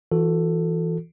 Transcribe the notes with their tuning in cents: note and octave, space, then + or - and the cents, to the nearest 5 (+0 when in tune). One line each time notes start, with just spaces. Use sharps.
E3 +0 F#4 -35 A4 +10